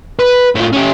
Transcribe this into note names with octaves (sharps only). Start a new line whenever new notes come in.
B4
A2 F4
C#4 G4